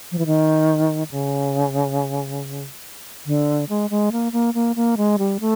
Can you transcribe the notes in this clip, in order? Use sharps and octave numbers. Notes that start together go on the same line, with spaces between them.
F3
E3
D#3
C#3
D3
G#3
G#3
A#3
A#3
A#3
A#3
G#3
G3
A3